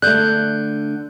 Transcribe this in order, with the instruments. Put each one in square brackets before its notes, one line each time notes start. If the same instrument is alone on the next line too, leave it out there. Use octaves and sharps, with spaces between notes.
[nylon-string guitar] D3 A3 [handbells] F#6 G6